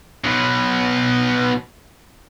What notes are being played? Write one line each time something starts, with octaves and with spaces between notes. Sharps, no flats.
B2 F#3